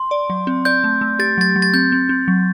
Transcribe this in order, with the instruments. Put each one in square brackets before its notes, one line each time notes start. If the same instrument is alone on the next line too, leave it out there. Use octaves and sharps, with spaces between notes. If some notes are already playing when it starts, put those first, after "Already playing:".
Already playing: [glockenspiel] C6
[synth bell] D5
F#3
C4
[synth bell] D5 [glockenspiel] G6
[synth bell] A3
A3
[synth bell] G4 [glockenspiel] A6
[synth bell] F#3 [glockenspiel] A6
[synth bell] F#3
[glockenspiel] A6
[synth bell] C4 [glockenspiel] G6
[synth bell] C4
C4
F#3